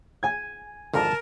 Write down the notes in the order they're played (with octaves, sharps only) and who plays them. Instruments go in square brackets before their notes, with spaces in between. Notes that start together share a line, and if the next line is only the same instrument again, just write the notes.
[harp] G#5 G#6
[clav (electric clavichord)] G#1 F2 D3 [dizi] A#4 [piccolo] A5